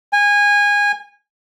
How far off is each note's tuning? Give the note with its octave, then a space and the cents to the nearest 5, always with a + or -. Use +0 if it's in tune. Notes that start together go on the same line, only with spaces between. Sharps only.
G#5 -20